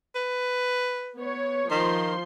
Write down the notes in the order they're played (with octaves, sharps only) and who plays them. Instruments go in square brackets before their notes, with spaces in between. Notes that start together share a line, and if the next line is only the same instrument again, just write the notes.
[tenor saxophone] B4
[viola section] B3 C#5
[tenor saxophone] D#3 [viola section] F3 C6